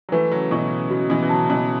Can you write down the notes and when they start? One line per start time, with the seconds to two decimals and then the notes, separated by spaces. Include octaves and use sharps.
0.09 F#3
0.12 E3 A3 B4
0.31 C#3 F#3
0.51 B2 E3 C#6
0.72 C#3
0.90 C#3 F#4
1.10 B2 E3
1.23 E3
1.29 C#3 F#3 A5
1.43 C#3
1.50 B2 E3